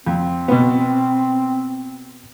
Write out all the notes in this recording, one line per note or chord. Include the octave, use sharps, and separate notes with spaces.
F2 C4
B2 B3